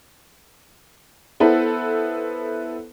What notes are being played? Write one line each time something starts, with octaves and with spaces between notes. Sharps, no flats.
B3 E4 A4 B4 C5